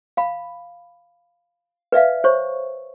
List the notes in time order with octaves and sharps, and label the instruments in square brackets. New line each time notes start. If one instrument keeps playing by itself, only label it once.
[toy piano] F5 B5
B4 D5 E5 F5
C5 C#5 C#6